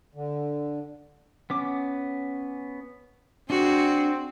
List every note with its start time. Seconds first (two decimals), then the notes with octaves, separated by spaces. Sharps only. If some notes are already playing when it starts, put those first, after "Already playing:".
0.15 D3
1.50 B3 C#4 D6
3.50 C4 D4 F#4 G#4